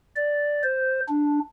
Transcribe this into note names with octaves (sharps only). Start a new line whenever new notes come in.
D5
C5
D4